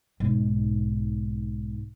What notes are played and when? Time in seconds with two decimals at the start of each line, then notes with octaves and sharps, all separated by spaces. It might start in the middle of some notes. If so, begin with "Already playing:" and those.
0.20 B1 G#2